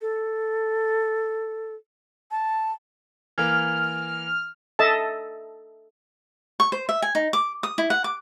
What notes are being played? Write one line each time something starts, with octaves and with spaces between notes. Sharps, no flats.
A4
A5
E3 A#3 F6
A4 D#5 E5 A5
C#6
C5
E5
G#5
D#4
D6
D#6
E4
F#5
D6